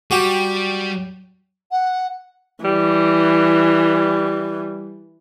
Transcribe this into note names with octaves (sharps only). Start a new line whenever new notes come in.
G3 F#4 G4 G5
F#5
E3 G3